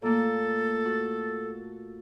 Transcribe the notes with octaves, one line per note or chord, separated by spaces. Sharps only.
A#2 A3 A#3 A4
F#4